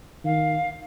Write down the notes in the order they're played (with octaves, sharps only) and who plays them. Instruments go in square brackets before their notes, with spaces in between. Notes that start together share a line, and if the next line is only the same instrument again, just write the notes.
[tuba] D#3 [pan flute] F5